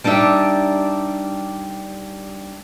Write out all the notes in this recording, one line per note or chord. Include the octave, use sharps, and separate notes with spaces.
G3 D4 D#4 G4 E5